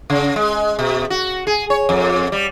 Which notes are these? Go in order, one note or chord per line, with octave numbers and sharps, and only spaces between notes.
C#3
G#3
B2
F#4
G#4
C#5
F2
G3